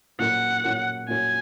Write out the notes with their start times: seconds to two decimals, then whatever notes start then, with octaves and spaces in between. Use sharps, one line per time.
0.19 A#2 F#3 C#4 F#4 A#4 F#5
0.64 A#2 F#3 C#4 F#4 A#4
1.08 A#2 F#3 C#4 F#4 A#4 G#5